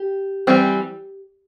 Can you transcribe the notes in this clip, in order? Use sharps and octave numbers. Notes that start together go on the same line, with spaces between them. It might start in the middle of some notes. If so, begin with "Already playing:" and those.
Already playing: G4
E3 G3 C4